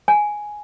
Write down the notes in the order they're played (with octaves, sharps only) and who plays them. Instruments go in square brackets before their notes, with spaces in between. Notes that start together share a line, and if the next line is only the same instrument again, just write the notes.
[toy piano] G#5